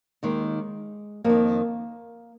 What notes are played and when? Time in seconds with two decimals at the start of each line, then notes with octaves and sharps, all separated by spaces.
0.23 D#2 D#3 G#3
1.24 F2 D#3 A#3